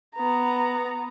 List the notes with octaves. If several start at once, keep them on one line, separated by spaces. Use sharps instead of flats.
B3 A#5